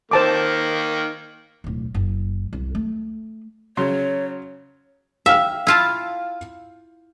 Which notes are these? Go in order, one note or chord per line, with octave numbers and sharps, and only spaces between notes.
D#3 A#3 C5 A5 D6
D1 B1
F#1
C2
A3
C#3 F#3 C#5 C6
E5 F5 G5 F6
E4 F4 A5